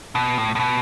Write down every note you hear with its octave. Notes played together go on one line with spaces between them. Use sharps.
B2
A2
A2
B2